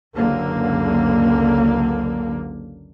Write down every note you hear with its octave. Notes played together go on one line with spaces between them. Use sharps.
F#1 C#2 D3 A#3